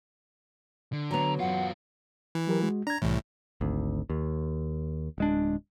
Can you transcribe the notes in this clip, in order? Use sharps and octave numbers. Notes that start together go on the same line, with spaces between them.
D3
F#3 B3 A#5
F#2 F4 F#5
E3
F#3 G4 A#4
G#3 F#4
D4 A#5 G#6
C2 A2 E3
G#1 D2
D#2
D1 G#3 D4